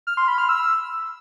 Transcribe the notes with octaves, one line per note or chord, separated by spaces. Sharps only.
F6
C6
B5
F6
E6